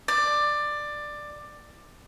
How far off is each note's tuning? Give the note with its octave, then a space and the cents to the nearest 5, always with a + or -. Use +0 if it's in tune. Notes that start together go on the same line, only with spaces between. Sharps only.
D5 +15